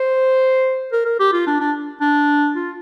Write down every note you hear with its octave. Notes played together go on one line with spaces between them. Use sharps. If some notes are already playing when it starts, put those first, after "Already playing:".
Already playing: C5
A#4
A#4
G4
F4
D4
D4
D4
F4